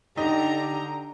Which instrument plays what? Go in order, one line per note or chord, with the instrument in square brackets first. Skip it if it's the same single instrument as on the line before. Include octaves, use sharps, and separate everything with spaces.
[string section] D3 A#5 [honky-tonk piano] D#4 [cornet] G4